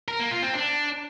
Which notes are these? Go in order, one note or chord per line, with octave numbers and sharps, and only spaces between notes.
A#4
A#3
F4
C4
D4